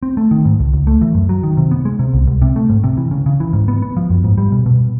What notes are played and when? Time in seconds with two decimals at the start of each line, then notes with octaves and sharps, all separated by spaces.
0.03 C4
0.17 A3
0.31 D#3
0.45 G#2
0.59 C#2
0.73 C#2
0.87 A3
1.01 E3
1.15 F#2
1.29 F#3
1.43 D#3
1.57 C3
1.71 B3
1.85 G#3
1.99 C3
2.13 C2
2.28 C2
2.42 C3
2.56 A3
2.70 G#2
2.84 C3
2.97 E3
3.11 C#3
3.26 C#3
3.40 E3
3.53 G#2
3.68 B3
3.82 B3
3.97 F3
4.10 F#2
4.24 G#2
4.38 G3
4.52 B2
4.66 B2